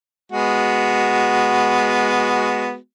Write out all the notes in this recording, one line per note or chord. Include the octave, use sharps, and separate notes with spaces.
G#3 B3 F#4